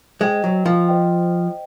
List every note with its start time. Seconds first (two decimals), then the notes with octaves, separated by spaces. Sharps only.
0.21 G#3 C5 D#5 G5
0.44 F#3
0.66 F3
0.88 C5 D#5 G5